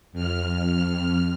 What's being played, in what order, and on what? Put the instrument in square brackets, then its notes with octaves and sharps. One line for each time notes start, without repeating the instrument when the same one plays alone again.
[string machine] F2 F6